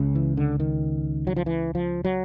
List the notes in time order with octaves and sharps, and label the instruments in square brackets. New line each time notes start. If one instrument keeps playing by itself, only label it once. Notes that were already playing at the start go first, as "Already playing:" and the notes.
Already playing: [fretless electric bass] C#2 C#3
E3
D3
D#3
F#3
F3
E3
F3
F#3